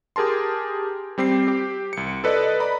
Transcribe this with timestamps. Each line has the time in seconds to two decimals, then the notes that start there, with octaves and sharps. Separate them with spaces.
0.16 G4 G#4 A#4 A5 C6
1.18 G3 C4 G4 C7
1.48 G4
1.93 C2 C#7
2.24 A4 B4 D5 D#5
2.60 D5 A#5 B5